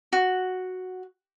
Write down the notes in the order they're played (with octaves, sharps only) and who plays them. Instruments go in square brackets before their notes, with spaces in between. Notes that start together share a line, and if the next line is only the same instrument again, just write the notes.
[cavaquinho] F#4